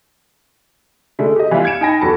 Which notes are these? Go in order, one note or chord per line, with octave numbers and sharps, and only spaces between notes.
D3 G#3 A3
G4 D#5
E3 G3 B3 E4 F4
F6 G#6 C#7 D7 E7
D#4 G5 G#5 B5 A#6
E2 F#4 A4 A5 B5